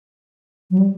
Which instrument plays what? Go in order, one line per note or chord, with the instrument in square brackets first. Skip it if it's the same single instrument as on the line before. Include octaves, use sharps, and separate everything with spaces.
[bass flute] F#3
G3